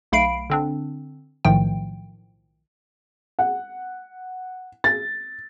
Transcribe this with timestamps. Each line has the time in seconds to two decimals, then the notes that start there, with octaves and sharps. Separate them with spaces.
0.12 B1 A3 F5 B5 C7 D7
0.50 D3 C4 D4
1.45 B1 A2 D#3 F3 A3 G5
3.39 F#5
4.84 A6